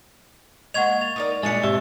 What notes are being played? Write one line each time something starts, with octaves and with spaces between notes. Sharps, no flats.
G#3 A#3 D#5 F#5 C#6 G#6 F7
A6 F7
D#4 A#4 D5
F#2 A#2 G#3 D4 E4 A6 C#7
G#2 B2 C4 G4 E5